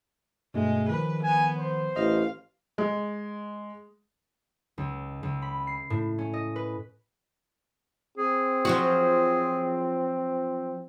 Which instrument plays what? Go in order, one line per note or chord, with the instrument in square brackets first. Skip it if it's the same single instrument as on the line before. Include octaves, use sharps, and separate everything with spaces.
[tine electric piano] G2 B2 A3 [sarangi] G#3
[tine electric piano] D#3 F3 [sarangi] B4
[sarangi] B3 [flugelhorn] G#5
[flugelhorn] C5
[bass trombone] A1 [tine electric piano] D#5 [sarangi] F5
[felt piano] G#3
[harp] C#2
C#2
B5
C7
A2
C#4
D#5
B4
[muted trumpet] C4 [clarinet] G#4
[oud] F3 F#3 F#4